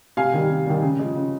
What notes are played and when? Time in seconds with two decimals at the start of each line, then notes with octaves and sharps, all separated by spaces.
0.17 C3 F5 G#5
0.33 D#3 G3
0.50 C3
0.67 D#3 G3
0.82 C#3
0.99 F3 G#3
1.16 C#3